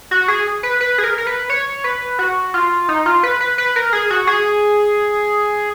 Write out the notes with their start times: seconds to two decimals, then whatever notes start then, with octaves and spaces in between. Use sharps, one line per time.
0.11 F#4
0.28 G#4
0.63 B4
0.80 B4
0.98 G#4
1.04 A#4
1.18 A#4
1.27 B4
1.50 C#5
1.84 B4
2.19 F#4
2.54 F4
2.89 D#4
3.06 F4
3.23 B4
3.40 B4
3.58 B4
3.76 A#4
3.93 G#4
4.10 F#4
4.27 G#4